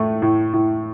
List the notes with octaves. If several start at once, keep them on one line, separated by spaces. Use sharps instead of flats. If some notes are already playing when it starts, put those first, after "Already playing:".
Already playing: A2 A3
A2
A2